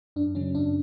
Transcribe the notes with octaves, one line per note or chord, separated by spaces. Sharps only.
F#2 D4
C#3 F#3 C#4
F#2 D4